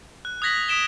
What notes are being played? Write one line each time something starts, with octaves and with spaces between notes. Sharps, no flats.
F#6
D#6 F#6 G#6 A#6 B6 F#7
D#6 B6 D7 E7 G7